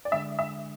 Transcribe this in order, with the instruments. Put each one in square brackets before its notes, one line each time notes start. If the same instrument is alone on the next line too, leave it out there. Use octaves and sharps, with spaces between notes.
[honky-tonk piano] D5
[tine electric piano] D3 G#3 D4 [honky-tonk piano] E5
[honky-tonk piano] E5